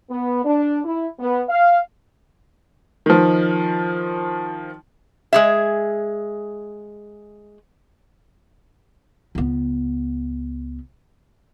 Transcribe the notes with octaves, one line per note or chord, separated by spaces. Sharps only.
B3
D4
E4
B3
F5
D#3 F3
G#3 G#4 E5
C#2 B3